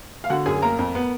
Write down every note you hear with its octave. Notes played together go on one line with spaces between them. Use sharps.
F5
D3 F#4 F#5
F#2 G#4 G#5
A#3 A#4 A#5
F2
B3